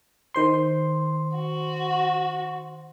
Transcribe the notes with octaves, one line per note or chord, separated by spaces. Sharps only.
D#3 C5 C6
F#4